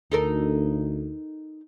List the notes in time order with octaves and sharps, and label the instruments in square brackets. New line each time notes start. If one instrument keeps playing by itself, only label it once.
[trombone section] D2 [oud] D#4 A4 A#4